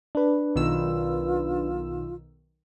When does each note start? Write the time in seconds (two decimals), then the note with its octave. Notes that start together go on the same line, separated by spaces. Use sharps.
0.15 D4 B4
0.55 B1 D#3 F4 E6